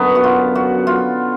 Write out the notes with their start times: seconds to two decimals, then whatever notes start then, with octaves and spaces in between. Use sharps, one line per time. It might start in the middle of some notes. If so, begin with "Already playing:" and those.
Already playing: F#2 D3 F#3 B3
0.15 F#4
0.24 F4
0.55 F#4
0.87 F4